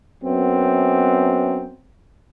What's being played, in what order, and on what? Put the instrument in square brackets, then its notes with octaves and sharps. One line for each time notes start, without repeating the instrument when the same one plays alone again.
[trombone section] F#2 B3 C4